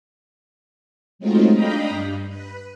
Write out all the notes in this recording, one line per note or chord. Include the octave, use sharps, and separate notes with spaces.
F#3 G#3 A3 C4 D#4 F4
D4 D#5 F5 G5 A#5 B5
G2
B4